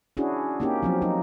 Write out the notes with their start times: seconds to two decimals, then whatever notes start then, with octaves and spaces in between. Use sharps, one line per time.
0.17 C#4 D4 E4 F#4 G#4
0.60 A#3 C4 C#4 D#4 G4
0.83 F3 F#3 C4
1.02 F#3 D#4